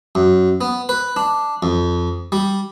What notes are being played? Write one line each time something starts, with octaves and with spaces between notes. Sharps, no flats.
F#2
B3
B4
D4
F2
G3